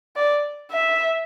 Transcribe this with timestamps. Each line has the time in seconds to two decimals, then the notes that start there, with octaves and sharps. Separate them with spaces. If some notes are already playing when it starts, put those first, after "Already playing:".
0.16 D5
0.71 E5